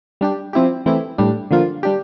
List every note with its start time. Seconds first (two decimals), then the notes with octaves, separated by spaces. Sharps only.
0.21 G3 D4 G4
0.53 F3 C4 E4 G4
0.86 E3 A3 C4 E4 G4
1.18 A2 G3 D4
1.51 D3 F3 A#3 F4
1.83 G3 D4 G4